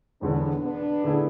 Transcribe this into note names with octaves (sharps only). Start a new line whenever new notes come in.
E1 E2 D3 B3 D4
B3 D4
D3 A3 E4 G#4